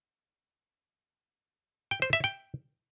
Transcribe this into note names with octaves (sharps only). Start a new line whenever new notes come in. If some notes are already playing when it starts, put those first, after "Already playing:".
G5
C5
E5
G5